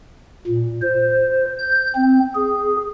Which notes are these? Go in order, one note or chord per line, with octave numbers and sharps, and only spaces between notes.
A#2
C5
G6
C4
G#4